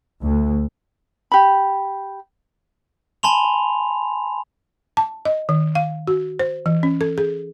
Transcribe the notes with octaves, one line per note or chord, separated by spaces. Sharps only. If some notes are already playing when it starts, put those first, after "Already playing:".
D2
G4 B5
G#5 A5 B5 C6 F7
A5
D#5
D#3
F5
F#4
C5
E3
C#4
A4
G#4